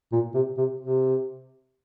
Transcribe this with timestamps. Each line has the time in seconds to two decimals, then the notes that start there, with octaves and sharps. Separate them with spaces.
0.12 A#2
0.34 C3
0.57 C3
0.80 C3